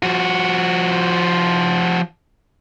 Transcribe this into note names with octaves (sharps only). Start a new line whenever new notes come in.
F3 F#4